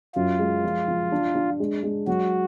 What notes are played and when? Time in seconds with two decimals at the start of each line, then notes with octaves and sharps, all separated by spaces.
0.15 F#2 F4
0.39 G#3
0.64 F3
0.88 F3
1.12 D4
1.35 D4
1.60 G#3
1.83 G#3
2.07 F#3 F#4